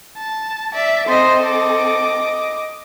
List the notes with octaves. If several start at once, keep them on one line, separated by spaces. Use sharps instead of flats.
A5
D5 E5
C4 A4 C5 D#5
D#5 D6